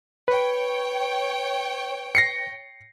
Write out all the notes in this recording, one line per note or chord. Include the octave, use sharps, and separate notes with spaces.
B4 C#5 G5
A#6 C7 C#7